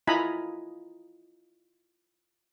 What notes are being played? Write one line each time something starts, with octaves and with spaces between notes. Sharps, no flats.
E4 F4 D#5 G#5 A#5 B5